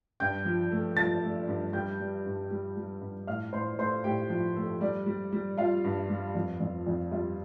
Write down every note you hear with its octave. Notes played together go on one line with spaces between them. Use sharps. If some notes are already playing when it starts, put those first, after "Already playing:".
G2 G5 G6
F3
A3
F3 A5 A6
A3
G2
G3 G5 G6
G3
G2
G3
G3
G2
A2 F5 F6
A2 C5 C6
A3 C5 C6
A2 G4 G5
F3
A3
G3 D5
G3
G3
G3 F4 F5
G2
G3
F2
F2
F2
G3 F4 F5